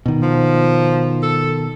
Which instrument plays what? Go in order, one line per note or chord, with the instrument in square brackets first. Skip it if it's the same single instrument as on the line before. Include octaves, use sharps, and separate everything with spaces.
[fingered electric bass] B2 D#3
[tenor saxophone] F3
A4